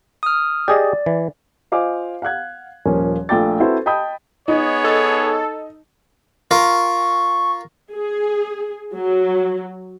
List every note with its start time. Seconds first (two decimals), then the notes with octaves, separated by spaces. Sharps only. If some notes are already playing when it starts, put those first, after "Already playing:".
0.23 D#6 F6
0.68 G4 G#4 D5 D#5
1.06 E3
1.72 F4 C5 D#5 F5 G#5 D6
2.22 F5 F#5 F#6 G#6
2.86 D#1 F3 A#3 C#4 G#5
3.29 A#1 A3 F4 G5 D6 A6
3.60 C4 E4 F#4 A4 B4 C5
3.86 D#5 G5 A5 B5 D#6 G6
4.48 B3 D#4 G#4 C#5
4.84 A4
6.51 F4 A#4 C#6
7.92 G#4
8.93 F#3